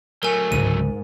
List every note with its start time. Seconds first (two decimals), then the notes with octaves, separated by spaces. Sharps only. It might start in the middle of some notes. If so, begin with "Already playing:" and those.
0.23 F#3 A3 A#4 G#5
0.52 C#2 G#2 D3 D#7